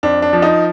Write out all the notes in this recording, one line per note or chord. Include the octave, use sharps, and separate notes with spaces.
F2 D4
D4
F3
D#4